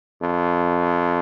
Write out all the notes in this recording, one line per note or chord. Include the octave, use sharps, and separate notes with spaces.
F2